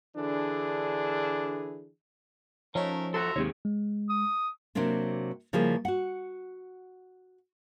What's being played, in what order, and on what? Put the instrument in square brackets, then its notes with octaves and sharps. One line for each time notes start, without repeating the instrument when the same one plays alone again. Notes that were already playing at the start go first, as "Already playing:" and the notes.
[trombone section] D3 E3 D4 G#4
[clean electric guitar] F3 [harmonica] A3 A#4 [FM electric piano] C#4 D#4 C#5
[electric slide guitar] F2 F#4 A4 [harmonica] E5 A#5 C6
[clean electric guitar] D#2 [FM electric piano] G#2 C3 [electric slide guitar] C4 G#4 C#5
[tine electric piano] G#3
[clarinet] D#6
[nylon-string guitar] C3 F#3 A#3 C4 D4
C#3 F3 G3 A#3 E4 G#4
F#4 F#5